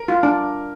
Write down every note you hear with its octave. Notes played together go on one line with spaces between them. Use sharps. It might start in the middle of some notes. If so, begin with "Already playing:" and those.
Already playing: A#4
F4
D4